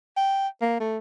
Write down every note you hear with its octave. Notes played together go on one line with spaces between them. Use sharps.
G5
A#3
A3